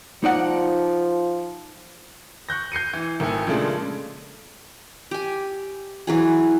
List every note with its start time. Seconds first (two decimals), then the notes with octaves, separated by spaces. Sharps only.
0.24 F3 D#4 D5 F#5
2.49 C#6 F#6 G6 A#6
2.72 G6 C7 C#7 D#7
2.94 E3
3.20 G#1 D#3 A3 A4 G#5
3.46 A#2 C#3 F3 G#3 A3 D4
5.11 G4 G#5
6.07 E3 F#3 G#4